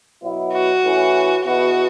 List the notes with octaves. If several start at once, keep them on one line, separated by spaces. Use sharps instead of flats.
B2 F#3 B3 E4
F#4
A2 E3 C#4 E4
E2 B2 B3 E4 F#4